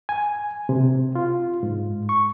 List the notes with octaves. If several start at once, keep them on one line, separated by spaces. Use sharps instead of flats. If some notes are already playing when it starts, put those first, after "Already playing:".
G#5
C3
F4
G#2
C#6